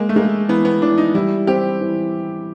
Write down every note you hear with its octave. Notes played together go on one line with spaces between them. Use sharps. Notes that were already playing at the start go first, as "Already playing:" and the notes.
Already playing: G#3 A#3
A3
G#3 A#3
E3 B3
B3
E3 D4
D#4
G3 E4
C4 G4
E3